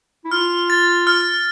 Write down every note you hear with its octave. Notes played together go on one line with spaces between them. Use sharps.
E4
F4 F6
A6
F6